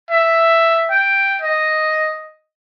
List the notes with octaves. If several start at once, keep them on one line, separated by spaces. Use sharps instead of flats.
E5
G5
D#5